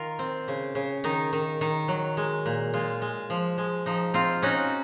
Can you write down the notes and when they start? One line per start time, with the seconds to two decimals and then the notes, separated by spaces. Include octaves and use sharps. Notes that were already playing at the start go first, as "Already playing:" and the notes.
Already playing: D#3 F4 A#4
0.19 C4
0.48 C#3
0.75 C#3
1.04 D#3 D#4
1.33 D#3
1.61 D#3
1.88 F#3
2.17 G#3
2.46 A#2
2.74 G#3 F4
3.02 G#3
3.30 F3
3.58 G#3
3.86 F3 D#4
4.14 C4 F4
4.43 C#4 D#4 F#4